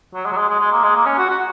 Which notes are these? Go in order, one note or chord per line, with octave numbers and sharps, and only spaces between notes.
F#3
G#3
F#3
G#3
G#3
G#3
A#3
G#3
A#3
C#4
F#4
F#4